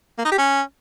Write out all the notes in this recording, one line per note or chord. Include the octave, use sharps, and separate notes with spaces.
A#3
D#4
G4
C#4